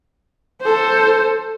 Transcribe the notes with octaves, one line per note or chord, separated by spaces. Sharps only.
A4 C5